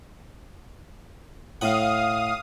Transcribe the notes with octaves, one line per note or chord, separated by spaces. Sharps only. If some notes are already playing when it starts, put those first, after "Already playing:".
A2 F5 F#5 D#6